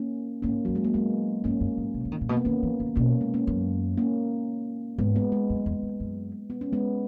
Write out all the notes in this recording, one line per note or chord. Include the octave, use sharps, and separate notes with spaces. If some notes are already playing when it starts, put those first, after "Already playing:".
Already playing: A#3 C#4
G#2 A#3 C#4
F#2 F#3
G#3
A#3
E2 G#3 B3
G#2 A#3 C#4
F#2
G#2
B2
E3
D#3
A#2
B2 A#3
B3
D#3 A#3 C#4
E3
D#3
B2 A#3 C#4
G#3 B3
A#3 C#4
F#2
A#3 C#4
G#2 G#3 B3
G#3 B3
G#3
F#2
E2
F#2
F#2
B3
C#4
G#3 B3